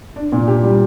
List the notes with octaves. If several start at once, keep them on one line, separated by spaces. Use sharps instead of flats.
D4
A#2
G4
G3